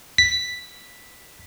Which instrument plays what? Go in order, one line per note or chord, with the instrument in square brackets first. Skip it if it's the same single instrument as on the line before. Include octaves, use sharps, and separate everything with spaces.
[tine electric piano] B6